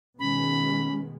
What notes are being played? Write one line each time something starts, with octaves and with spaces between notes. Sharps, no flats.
B2 D#3 G#3 C#4 B5